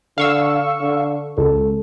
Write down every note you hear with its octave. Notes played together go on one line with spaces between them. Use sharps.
D3 F5 C#6 E6
D3
C#2 A4